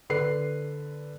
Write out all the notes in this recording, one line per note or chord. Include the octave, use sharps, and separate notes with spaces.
D3 B4 C7